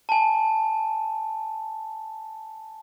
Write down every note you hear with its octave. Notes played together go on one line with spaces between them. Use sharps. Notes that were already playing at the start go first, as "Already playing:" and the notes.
G#5 A5